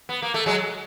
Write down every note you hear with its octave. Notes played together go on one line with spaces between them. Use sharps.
B3
A#3
A3
F#3 G#3